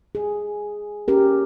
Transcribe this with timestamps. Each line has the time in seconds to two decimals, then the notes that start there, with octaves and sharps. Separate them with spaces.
0.15 G#4
1.08 C#4 G4 A#4